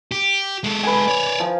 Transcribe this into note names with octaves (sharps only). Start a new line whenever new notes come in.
G4
G#3 A4
B4 G#5
C#5 D5
F3